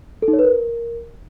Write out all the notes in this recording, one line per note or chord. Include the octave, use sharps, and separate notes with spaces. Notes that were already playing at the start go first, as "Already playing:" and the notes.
A4
D#4
C#5
B4
A#4